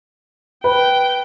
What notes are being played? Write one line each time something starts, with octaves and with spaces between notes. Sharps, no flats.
B4 G5